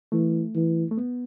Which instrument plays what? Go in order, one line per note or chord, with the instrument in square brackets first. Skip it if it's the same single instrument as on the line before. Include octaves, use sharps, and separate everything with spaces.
[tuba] E3 [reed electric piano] A3
[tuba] E3
[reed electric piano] A3
B3